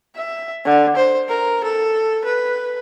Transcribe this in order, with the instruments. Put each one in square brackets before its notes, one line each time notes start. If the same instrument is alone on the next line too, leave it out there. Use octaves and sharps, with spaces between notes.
[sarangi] E5
D3
C5
A#4
A4
B4